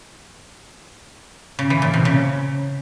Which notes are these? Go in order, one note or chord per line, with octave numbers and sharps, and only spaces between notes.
C#3
E3
A#2
C3
C#3